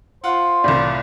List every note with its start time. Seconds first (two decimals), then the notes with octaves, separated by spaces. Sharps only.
0.24 F4 C5 F#5
0.64 C2 A2 D5